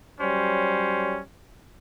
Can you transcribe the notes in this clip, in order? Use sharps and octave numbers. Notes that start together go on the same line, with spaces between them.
F#3 G3 C#4 C5